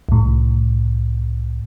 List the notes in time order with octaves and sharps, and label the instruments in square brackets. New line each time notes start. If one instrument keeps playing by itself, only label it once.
[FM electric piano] C2 A2